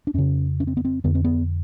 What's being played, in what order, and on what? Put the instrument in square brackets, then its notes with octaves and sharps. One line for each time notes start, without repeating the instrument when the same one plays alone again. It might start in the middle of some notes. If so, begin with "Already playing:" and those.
[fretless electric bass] D4
F2 C#3 C#4
C#4
C4
B3
C4
F2 D3 B3
C4
B3